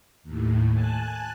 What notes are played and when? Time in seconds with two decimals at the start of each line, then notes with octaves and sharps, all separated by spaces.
0.23 D#2 A2
0.72 G#5 A5 F#6